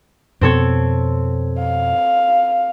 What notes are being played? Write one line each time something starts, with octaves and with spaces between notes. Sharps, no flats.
F2 B2 B3 C4 A4 C#5
F5